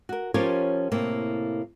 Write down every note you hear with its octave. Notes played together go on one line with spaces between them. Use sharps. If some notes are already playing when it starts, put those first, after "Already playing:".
F#4 A#4
F3 C#4 F4 G4 A#4 C#5
A2 C3 A#3